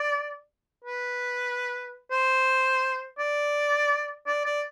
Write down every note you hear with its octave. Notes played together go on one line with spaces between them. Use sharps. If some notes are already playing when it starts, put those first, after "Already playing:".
Already playing: D5
B4
C5
D5
D5
D5